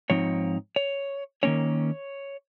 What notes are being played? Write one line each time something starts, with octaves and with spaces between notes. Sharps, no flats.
G#2 F3 C4 D#4 C#5
C#5
D#3 A#3 C#4 C#5